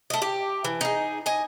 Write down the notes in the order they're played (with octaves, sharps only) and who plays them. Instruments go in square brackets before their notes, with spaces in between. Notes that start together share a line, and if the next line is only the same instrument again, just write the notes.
[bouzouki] A3 D#5
G4
E3
D#4 G#4
D#5 G#5